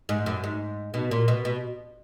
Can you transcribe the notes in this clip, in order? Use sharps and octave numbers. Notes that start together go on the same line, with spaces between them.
G#2
F#2
G#2
B2
A#2
B2
B2